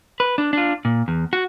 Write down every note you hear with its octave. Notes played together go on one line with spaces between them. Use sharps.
B4
D4
D4 F4
A#2
E2
F#4